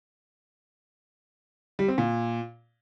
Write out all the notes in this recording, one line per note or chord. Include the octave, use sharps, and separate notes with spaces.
G3
C4
A#2